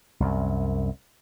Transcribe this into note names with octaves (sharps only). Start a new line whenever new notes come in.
C2 F#2